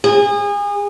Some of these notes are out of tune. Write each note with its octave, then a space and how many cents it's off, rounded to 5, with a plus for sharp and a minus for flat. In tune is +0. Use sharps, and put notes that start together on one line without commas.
G#4 -30